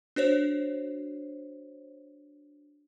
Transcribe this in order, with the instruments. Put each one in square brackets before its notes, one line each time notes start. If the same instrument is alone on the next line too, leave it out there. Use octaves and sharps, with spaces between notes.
[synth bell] D4 F#4 C5 C#5